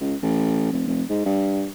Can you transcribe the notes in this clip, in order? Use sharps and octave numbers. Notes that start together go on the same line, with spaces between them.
C#2
A1
F1
F1
G#2
G2